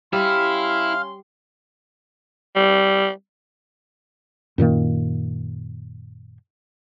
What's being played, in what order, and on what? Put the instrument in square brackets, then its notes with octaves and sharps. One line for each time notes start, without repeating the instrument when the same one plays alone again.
[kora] G3 [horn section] C#4 C6 [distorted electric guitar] E4 [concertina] F5 F6
[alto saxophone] G3
[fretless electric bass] F#2 A#2 D#3 A#3